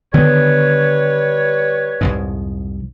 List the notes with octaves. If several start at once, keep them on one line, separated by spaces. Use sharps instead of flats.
D3 D#3 G3 B3 B4 C#5
C2 F2 G#2